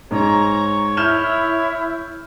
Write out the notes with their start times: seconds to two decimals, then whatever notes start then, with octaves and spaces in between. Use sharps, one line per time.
0.11 G#2 C#5 A#5
0.97 E4 F6 G6 E7